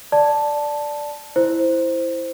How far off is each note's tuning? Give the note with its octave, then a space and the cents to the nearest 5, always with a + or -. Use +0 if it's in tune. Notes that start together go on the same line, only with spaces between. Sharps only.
D5 +0 A5 +0
E4 +0 C5 +0